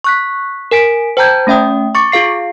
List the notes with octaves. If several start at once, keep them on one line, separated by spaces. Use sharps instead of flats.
C#6 F#6 B6
A#4 G#5 B6 D7
C5 G5 A5 A#5 G6 G#6
A3 C#4 E5 G5 D#6
C#6 D6 A6 C#7
F4 G#4 F5 C7